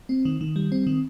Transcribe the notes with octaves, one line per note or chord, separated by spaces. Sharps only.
C4
D#3
D#3
G3
C4
D#3